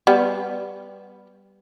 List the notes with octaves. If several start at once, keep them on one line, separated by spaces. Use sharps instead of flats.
G3 B3